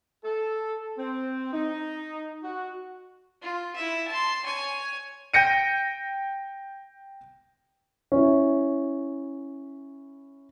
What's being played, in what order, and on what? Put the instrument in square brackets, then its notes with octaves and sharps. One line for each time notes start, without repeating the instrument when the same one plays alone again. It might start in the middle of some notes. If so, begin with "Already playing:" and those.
[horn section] A4
C4
D#4
F#4
[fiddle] F4
E4 E5
A5 C6
C#5 G#5
[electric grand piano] G5 G6 A#6 C#7 D#7
[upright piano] C#4 E4